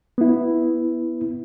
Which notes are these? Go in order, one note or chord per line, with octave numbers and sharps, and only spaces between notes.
B3 E4